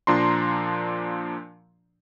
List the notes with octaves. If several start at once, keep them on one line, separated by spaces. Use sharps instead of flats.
A#2 F3 D4 A#5 C6